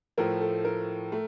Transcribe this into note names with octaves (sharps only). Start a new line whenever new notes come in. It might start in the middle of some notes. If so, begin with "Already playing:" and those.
A2 F3 A3 A#4
A4
A#4
A3